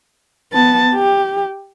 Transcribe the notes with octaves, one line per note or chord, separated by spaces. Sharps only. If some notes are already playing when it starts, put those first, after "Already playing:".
B3 A5
G4